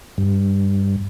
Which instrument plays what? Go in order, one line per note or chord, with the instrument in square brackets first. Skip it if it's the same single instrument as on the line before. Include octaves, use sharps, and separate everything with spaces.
[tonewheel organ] G2